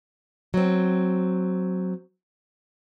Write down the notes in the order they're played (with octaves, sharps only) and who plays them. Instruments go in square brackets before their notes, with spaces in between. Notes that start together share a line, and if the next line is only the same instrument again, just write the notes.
[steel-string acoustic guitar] F#3 C4